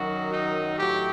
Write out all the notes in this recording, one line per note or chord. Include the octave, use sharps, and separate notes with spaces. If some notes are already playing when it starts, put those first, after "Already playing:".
Already playing: F#2 D#3 F#3 F#4
D#4
A2 F#3 G4